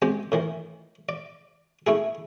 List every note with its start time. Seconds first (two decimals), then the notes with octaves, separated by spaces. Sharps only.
0.02 G#3 C4 G4
0.32 A2 D#3 E3
1.09 D5
1.87 A3 E4 G#4